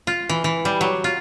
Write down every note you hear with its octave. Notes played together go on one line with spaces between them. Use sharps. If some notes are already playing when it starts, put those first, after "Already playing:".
F4
E3
E3
G3
F#3
F4